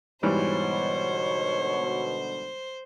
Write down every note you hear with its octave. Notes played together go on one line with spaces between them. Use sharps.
G#2 B2 D3 E3 G3 C5 C#5